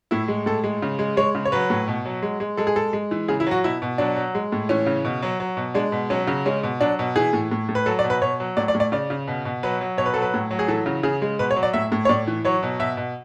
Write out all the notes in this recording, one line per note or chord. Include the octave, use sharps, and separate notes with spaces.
A2 E4
G#3
A2 A4
G#3
C#3
G#3
G#3 C#5
C#3
C#5
F#3 B4
A2
B2
F#3
G#3
G#3
G#3 A4
G#4
G#3 A4
G#3
E3
C#3 G#4
E4
F#3 F#4
B2 E4
B2
F#3 D4
F#3
G#3
A2
E3 C#4
C#3
B2
F#3
F#3
B2
G#3 D4
B2
F#3 C#4
C#3
G#3 C#4
B2
F#3 D4
B2
E3 G#4
A2
A2
A2
B4
F#3 A4
D5
B2
B4
B2 C#5
F#3
A2 D5
D5
A2
D5
C#3 D5
C#3
B2
B2
F#3 B4
F#3
B2 C#5
B4
F#3 A4
B4
A2
F#3
G#4
E3 A4
C#3
C#3 G#4
G#3
B2 B4
C#5
F#3
D5
A2 E5
A2
C#5
A2 D5
E3
F#3 C#5
B2
B2 E5
B2